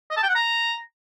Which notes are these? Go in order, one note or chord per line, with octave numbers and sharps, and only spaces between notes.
D#5
A5
G5
F#5
A#5